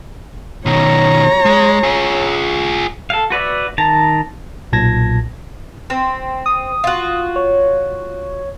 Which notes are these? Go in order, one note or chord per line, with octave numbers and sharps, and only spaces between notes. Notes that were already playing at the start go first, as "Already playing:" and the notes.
B2 D#3 C#5 A#5
G#3
F4 G#4
A4 F5
F#4 B4 D5 E5
D#3 A5 A#5
B1 A#2 A5 G#6 A#6
C4
D#6
F4 F#4
C#5